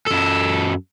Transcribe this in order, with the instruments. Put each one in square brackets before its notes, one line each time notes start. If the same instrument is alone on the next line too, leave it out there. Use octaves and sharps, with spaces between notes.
[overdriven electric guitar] F#2 A4